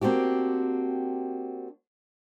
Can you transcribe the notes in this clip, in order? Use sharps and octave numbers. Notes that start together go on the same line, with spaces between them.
A#3 C4 D4 F#4 G4